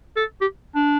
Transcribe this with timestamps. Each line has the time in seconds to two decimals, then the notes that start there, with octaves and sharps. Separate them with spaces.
0.17 A4
0.42 G4
0.75 D4